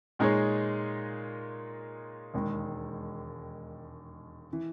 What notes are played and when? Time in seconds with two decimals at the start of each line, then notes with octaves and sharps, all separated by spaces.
0.19 A#2 G#3 D#4 G#4 C#5
2.34 E1 D#2 D#3 G#3
4.53 E3